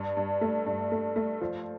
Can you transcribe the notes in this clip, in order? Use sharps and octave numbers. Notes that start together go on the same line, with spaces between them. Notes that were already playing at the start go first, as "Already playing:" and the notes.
Already playing: G2
G2
A3
G2
A3
A3
F3